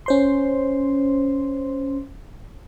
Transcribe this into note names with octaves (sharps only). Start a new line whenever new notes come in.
C#4 C5 C6